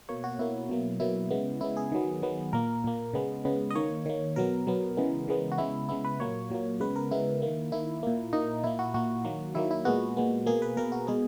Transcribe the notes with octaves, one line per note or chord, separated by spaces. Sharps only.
B2 A#3 C#5
F#4
B2 A#3 E4
B2 F#3 A#3
B2 F#3 A#3 E4
C#3 G#3 B3
C#3 G#3 B3 E4
G#4
D#3 F#3 B3
D#3 F#3 B3
A#2 A#3 A#4
A#2 A#3
C#3 G#3 B3
C#3 G#3 B3
D#5
D#3 A#3 C#5
D#3 A#3
B2 F#3 B3 A#4
B2 F#3 B3
C#3 E3 G#3 B3
C#3 E3 G#3 B3
F#4
C#3 G#3 B3 E4
C#3 G#3 B3 E4
B4
A#2 F#3 A#3 C#5
A#2 F#3 A#3
C#3 G#3 B3 B4
A#4
C#3 G#3 B3 E4
D#3 A#3
D#3 A#3 E4
A#2 A#3
A#2 A#3 D#4
A#2 A#3 E4
F#4
A#2 A#3 F#4
D#3 F#3 A#3
D#3 F#3 A#3 E4
E4
A#2 G#3 B3 F#4
A#2 G#3 B3
B2 A#3 G#4
B4
B2 A#3 A#4
F#4
B2 G#3 B3 G#4